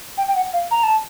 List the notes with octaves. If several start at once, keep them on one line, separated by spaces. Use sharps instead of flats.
G5
G5
F#5
F5
A#5
A5